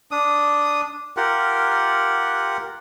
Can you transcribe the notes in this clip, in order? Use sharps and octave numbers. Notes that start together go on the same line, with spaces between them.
D4 D#6
F4 G4 A#4 F#5